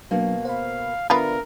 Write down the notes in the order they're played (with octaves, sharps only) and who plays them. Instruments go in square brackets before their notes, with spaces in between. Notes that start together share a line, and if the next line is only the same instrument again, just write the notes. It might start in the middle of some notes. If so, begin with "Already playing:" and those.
[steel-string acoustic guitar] B2 A#3 [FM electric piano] F#3 D4
[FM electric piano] C5 B5 [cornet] F5
[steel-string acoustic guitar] D3 [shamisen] B3 F4 B4 [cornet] A#4 [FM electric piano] E5